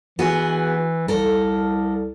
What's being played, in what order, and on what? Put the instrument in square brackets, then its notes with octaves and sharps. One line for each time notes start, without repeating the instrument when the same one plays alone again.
[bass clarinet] E3 [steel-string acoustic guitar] B3 F#4 G#4
[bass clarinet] C2 [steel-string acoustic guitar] A4 A#4